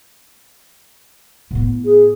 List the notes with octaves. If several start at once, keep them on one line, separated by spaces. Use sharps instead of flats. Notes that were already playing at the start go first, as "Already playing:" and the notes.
A2 B3
G#4